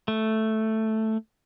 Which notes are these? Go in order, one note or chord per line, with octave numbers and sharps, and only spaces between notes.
A3